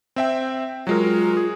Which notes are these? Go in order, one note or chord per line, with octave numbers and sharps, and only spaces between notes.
C4 E5 G5
F#3 G#3 F4 A#4
G#4